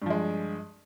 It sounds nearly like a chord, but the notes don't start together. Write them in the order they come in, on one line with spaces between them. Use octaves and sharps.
G2 F3 G#3